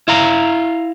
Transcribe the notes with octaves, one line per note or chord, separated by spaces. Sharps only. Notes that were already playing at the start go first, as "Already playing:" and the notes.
E4 F5 A#5